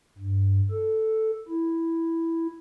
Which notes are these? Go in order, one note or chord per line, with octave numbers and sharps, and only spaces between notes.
G2
A4
E4